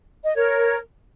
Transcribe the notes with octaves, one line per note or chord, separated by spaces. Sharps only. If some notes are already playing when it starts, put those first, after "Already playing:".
D#5
A#4 C#5